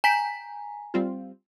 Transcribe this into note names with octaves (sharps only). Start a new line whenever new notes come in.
G5 G#5 A#5 B6
G3 C4 F4